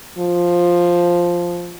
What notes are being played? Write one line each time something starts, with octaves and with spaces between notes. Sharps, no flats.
F3